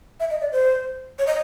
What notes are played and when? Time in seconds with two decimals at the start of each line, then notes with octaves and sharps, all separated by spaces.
0.20 E5
0.31 D#5
0.41 D5
0.52 C5
1.19 C#5
1.27 D#5